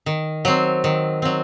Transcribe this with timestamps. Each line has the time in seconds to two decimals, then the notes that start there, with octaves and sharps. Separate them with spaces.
0.06 D#3
0.45 F#3 C4
0.84 D#3
1.22 F#3 C4